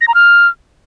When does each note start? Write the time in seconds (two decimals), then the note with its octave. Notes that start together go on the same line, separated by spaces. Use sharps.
0.01 A#6
0.08 A#5
0.14 F6